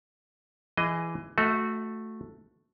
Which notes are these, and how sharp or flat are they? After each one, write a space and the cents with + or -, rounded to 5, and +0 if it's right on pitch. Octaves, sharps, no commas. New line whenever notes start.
E3 +20 G#4 +0 D#5 +0
A3 +0 F#4 -15 D#5 +45